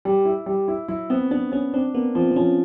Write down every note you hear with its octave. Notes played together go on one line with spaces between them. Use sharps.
G3
E4
G3
E4
F#3 E4
B3 C4
B3 D4
B3 C#4
C4 D4
A#3 B3
F3 C4
C4
F3 C#4